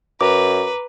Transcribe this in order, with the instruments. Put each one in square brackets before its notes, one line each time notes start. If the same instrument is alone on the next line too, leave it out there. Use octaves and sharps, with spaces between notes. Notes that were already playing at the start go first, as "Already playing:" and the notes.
[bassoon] F#2 [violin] B4 [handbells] A#5 D6